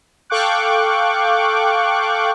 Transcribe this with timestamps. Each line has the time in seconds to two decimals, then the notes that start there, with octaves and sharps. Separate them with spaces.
0.30 A4 F5 G5 C#6 D6 F#6